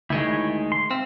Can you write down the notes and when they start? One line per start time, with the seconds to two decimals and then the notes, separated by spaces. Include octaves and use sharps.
0.10 D2 D#3 G#3 E4 C#5
0.72 C6
0.91 C4 E5 F5